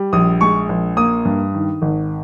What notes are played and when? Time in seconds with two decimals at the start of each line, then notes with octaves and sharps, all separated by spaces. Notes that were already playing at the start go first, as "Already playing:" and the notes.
Already playing: G3
0.13 A#1 D#6
0.41 G#3 C#6
0.69 A#1
0.97 A#3 D#6
1.25 G2
1.54 D#3
1.82 G#1